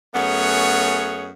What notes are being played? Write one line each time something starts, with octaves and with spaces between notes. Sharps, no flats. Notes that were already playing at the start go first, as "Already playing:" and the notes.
F#2 A3 B3 G#4 C#5